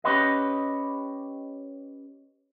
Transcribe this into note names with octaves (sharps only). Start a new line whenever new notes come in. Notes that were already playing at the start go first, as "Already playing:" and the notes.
C#4 G4 B4 D#5